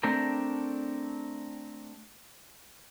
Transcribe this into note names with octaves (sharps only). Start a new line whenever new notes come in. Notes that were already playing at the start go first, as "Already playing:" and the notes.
A3 C4 D4 A#4 G5